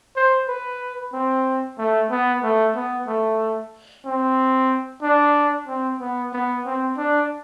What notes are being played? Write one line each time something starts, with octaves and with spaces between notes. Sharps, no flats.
C5
B4
C4
A3
B3
A3
B3
A3
C4
D4
C4
B3
B3
C4
D4